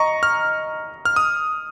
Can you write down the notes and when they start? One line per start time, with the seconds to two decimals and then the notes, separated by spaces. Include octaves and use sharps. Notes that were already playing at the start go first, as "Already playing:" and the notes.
Already playing: D#5 A#5 C#6
0.23 F6
1.05 F6
1.16 D#6